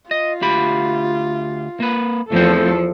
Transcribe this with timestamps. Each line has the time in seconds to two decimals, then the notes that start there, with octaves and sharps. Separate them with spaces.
0.11 F4 D#5
0.42 D2 G4 B5
1.80 A#3 B4
2.32 E2 F3 A3 C4 A4 G5